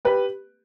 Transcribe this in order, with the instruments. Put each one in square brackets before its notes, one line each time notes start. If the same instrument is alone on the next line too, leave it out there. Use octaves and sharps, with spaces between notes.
[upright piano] G4 B4